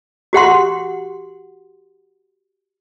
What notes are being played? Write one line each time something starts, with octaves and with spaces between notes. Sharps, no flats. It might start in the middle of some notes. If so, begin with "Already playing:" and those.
F#4 G4 F#5 C6